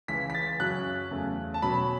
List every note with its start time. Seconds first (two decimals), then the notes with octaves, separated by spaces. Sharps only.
0.08 C#2 C#3 E3 B6
0.30 B6
0.35 A6
0.59 F#2 C#3 F#3 C#4 F#6
1.11 E2 C#3 A3
1.54 A5
1.62 B2 F#3 C#4 B5